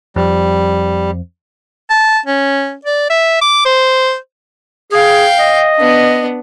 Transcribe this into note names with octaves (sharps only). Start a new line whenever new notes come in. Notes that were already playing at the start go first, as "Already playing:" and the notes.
F2 G3
A5
C#4
D5
E5
D6
C5
G#4 F5 G5
D#5
B3 D4